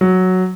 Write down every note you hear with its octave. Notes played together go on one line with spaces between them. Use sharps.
F#3